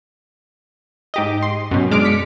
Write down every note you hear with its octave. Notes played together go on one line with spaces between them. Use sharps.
G#2 G4 D#5
C6
F#2 B2
G#3 D4 D6 F6 D7
B6 C#7